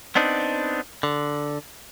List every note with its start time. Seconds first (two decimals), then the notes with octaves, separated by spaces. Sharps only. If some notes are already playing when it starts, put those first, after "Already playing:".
0.15 B3 C4 D4 D#4
1.03 D3